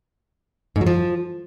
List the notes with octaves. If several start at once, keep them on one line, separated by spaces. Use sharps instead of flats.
G#2
F#3
F3